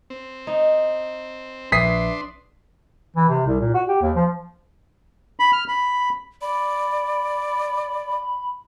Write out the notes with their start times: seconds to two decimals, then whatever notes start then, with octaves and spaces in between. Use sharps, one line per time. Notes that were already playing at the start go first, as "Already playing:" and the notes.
0.10 C4
0.47 D#4
1.72 A#1 D4 B4 E5 C6 D#6 B6 C7
3.16 E3
3.29 C3
3.47 C2
3.61 A#2
3.75 F#4
3.88 G4
4.02 D#2
4.16 F3
5.40 B5
5.53 F6
5.68 B5
6.41 D5 B5